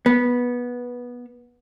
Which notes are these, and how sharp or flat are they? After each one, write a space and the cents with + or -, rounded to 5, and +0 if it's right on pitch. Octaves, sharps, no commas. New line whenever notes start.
B3 -15